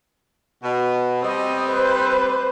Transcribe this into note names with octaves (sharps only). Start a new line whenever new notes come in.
B2
G3 C4 D#5
B4 C5